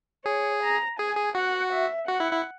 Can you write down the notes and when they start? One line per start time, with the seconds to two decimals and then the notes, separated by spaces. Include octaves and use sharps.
0.25 G#4 C#5
0.62 A#5
0.98 G#4 G#5
1.17 G#4
1.35 F#4 F#5
1.71 E5
2.08 F#4 F#5
2.20 E4
2.32 E4